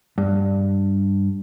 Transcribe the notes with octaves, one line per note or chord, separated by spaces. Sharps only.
G2